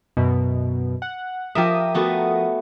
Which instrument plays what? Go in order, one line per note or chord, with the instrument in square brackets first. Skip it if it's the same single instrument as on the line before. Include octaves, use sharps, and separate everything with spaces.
[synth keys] F#2 B2
F#5
[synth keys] F3 A#4 D#6 [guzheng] G4 E5
[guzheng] A3 B3 F#4